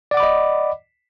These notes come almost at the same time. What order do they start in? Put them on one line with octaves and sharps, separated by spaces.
D5 F#5 D6 B5 D#5